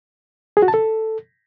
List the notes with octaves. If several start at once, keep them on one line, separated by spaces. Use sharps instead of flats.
G#4
F#4
A5
A4